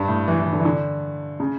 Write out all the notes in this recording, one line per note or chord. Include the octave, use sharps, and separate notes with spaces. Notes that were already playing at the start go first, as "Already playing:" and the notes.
Already playing: G2
A2
E3
E3
D3
E3
D3
C#3